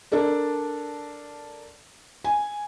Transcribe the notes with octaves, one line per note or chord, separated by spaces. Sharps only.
D4 A4 A#4 D5
G#5